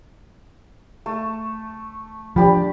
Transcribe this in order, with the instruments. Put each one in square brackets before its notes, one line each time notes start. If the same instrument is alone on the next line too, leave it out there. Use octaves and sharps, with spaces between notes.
[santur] A3
[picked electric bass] F3 [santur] D4 G4 B5